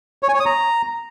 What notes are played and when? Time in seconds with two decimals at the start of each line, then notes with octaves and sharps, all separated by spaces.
0.23 C#5
0.28 G#5
0.34 C#5
0.40 D#6
0.46 A#5